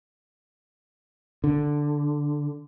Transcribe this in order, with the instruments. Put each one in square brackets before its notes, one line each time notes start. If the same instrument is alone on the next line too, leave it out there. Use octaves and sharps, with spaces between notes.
[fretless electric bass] D3